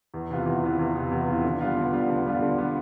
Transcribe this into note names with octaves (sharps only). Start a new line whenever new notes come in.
E2
C3 E3 B3 F4
E2
C3 E3 B3 F4
E2
C3 E3 B3 F4
E2
C3 E3 B3 F4
D3
G3 B3 F4
D3
G3 B3 F4
D3
G3 B3 F4
D3
G3 B3 F4